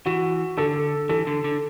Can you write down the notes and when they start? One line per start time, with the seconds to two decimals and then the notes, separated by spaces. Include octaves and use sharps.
0.06 E3 F#4
0.57 D3 A4
1.09 E3 A4
1.27 D3
1.44 D3